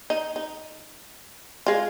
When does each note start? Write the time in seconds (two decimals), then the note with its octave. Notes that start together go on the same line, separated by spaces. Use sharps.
0.10 D#4
0.36 D#4
1.67 G#3 F4